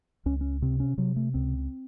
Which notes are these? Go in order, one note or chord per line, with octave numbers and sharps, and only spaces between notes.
C#2 C#4
C#4
C3 C4
C#4
C3 F#3
A3
C#2 C4